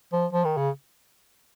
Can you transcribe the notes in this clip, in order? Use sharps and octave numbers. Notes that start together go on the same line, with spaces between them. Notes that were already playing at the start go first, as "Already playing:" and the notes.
F3
F3
D#3
C#3